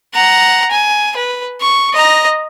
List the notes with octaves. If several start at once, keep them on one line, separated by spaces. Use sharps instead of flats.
F#5 A#5
G#5
B4
C#6
D#5 A#5